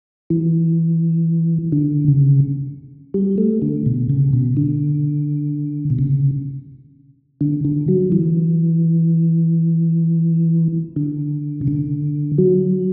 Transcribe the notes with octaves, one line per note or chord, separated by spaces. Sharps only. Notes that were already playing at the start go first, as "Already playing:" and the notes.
E3
D3
C#3
G3
A3
D3
B2
C#3
B2
D3
B2
C#3
D3
D3
F#3
E3
D3
C#3
D3
F#3